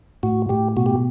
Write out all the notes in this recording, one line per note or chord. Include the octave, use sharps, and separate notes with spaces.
A2 F#4
A2 G4
B2 F#4
G4